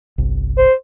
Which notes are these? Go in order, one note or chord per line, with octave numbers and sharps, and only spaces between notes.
G1 C2
C5